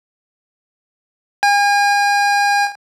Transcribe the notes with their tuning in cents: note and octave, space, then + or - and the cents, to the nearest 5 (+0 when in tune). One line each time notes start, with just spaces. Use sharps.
G#5 -40